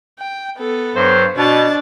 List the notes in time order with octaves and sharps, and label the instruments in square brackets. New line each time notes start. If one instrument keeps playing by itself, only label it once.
[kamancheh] G5
B3 A4
[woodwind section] G2 F#3 C5
[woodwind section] B2 [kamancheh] D4 A5